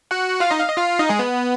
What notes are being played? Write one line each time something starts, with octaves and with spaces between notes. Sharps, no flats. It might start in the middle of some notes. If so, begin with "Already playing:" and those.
F#4 F#5
F4 F5
D#4 D#5
F5
D#5
F4 F5
D#4 D#5
G#3 G#4
B3